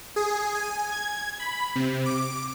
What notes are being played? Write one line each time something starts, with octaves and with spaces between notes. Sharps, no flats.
G#4
G#5
G#6
B5
C3
D6